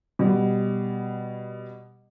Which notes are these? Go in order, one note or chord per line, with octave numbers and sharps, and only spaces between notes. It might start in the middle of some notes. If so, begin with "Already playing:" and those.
B2 G3